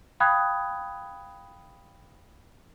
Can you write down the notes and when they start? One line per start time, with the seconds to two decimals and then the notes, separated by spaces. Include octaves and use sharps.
0.20 F5 G5 B5 D#6 F#6 G#6